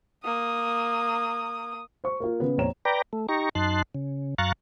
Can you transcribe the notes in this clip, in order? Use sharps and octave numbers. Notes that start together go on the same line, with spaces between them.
A#3 D#6
C5 C#6
A#3 F4
C#3 B3
A#1 F2 C4 C#5 A#5 E7
B4 D5 G5 A#5
A3
D#4 G4 A#5 C#6
F#2 D#4 A5 C6 F#6
C#3
F#2 F5 A#5 C#6 F#6 A6